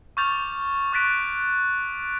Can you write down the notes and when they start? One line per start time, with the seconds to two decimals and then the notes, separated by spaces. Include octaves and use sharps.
0.17 C#6 D6 F6 G6 A6 F7
0.93 C#6 F#6 A6 B6 D7